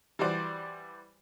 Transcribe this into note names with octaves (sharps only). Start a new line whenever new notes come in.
E3 G3 F#4 C5 D5